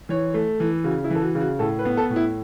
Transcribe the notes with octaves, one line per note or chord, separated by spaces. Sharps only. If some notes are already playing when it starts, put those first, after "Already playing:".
E3 C#5
A3
E3
C#3 F#4
E4
E3 A4
F#4
C#3
F#4
A2 A4
B4
B3
A4
A2
E4